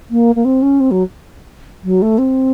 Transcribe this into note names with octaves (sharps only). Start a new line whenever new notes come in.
A#3
A#3
C4
C#4
C4
F#3
F#3
A3
C4